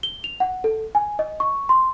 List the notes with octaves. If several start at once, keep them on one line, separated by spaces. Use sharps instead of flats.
G7
F7
F#5
A4
G#5
D#5
C#6
C6